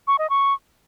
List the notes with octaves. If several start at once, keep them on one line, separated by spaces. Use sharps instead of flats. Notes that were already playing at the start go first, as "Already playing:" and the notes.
C#6
D#5
C#6